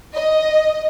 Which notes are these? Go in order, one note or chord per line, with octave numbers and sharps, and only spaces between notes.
D#5